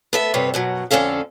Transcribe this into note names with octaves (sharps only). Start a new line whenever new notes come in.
B3 A4 E5
D2 G2 C3 A3 B4 C#5
F#2 B2 F#3
F2 D3 E3 C#4 A4 F5